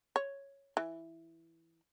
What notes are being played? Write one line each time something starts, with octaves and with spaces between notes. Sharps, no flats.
C#5
E3